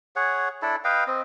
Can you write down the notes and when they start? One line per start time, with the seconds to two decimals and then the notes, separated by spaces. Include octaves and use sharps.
0.16 G#4 C#5 F#5
0.62 D4 E4 A4
0.84 B4 D#5 F5 G5
1.07 C4 D#5